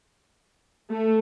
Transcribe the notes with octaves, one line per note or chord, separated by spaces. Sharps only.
A3